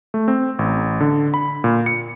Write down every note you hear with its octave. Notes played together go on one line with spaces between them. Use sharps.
A3
C4
A1
D3
B5
A#2
C#7